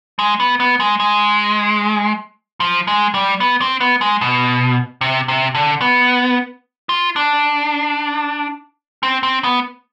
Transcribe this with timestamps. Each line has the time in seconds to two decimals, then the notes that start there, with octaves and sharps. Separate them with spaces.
0.19 G#3
0.40 B3
0.60 B3
0.80 G#3
1.00 G#3
2.60 F3
2.87 G#3
3.14 G3
3.40 B3
3.61 C4
3.81 B3
4.01 G#3
4.21 B2
5.01 C3
5.28 C3
5.55 D3
5.81 B3
6.89 F4
7.16 D4
9.03 C4
9.23 C4
9.44 B3